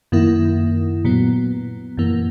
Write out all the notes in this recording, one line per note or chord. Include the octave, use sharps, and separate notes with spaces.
F#2 D#3 A#3 E4
A#2 F#3 B3
F#2 E3 A#3